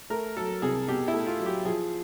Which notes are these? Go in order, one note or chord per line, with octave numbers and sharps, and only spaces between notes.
A3 A#4
F#3 A4
C2 G#4
B2 G4
E4
A3
F4
F#3
G4
F3 G#4